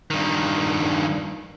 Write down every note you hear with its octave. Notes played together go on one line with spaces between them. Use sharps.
G2 D#3